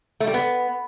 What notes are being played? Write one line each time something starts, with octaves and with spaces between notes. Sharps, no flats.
A3
G3
B3